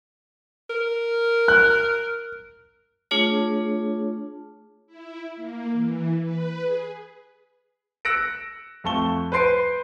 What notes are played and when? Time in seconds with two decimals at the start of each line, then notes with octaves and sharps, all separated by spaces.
0.70 A#4
1.48 F#6
3.11 A3 D4 F4 G#4 C#5
4.87 E4
5.36 A#3
5.72 E3
6.20 B4
6.60 G#4
8.05 E6 F#6 A#6 C#7 D7
8.84 F2 A3 A5 C#6 G7
9.32 B4 C5 C6 C7 D7